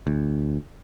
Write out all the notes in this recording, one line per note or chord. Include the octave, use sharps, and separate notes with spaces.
D2